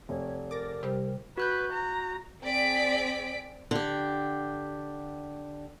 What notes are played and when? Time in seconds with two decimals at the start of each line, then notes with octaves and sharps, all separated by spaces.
0.09 F1 C#5
0.51 A#4 D6 A6 A#6
0.83 C3 G3 G4 C5
1.38 F#4 B4 F#6 G6
1.72 A#5
2.43 C4 G#4 D5 B6 D7
3.71 D3 G4